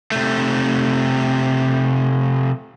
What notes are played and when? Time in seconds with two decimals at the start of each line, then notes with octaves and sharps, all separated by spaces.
0.12 C3 A3